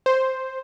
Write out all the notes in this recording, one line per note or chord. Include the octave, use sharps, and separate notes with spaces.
C5